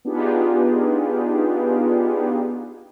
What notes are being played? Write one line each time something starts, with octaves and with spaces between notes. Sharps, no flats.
B3 D4 D#4 F4 G4 G#4